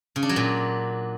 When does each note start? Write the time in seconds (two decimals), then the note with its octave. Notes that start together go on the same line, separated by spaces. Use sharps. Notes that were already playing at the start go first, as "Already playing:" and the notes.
0.16 C#3
0.23 D4
0.29 F#3
0.36 A#2